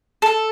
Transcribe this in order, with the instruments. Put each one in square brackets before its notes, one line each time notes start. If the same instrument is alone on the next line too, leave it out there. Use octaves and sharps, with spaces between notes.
[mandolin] A4